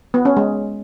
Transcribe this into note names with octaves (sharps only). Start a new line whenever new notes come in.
B3
C#4
G#3